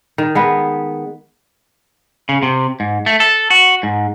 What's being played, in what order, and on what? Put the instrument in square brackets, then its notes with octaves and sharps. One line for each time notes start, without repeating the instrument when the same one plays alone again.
[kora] D#3
G#3 B3 B4
[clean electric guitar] C#3
C3
G#2
A3
A4
F#4
G#2